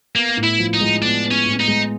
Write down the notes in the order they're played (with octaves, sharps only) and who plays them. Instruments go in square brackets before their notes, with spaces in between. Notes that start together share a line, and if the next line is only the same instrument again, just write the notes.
[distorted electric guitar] A#3 [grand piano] B3
[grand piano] A2
[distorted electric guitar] E4
[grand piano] F3
[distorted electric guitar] D#4
[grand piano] G#3
[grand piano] B3 [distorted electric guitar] D4
[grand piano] B3
[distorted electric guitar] C#4
[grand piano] A2
[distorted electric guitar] D#4
[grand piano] G#3